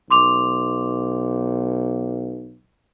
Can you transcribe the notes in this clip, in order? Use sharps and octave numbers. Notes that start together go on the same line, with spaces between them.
B1 C6 D6 F7